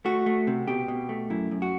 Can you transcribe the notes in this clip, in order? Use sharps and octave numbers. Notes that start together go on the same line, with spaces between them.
A3 F#4
A3
C3
B2 G4
B2
A3
F#2 E4
F#2
F#4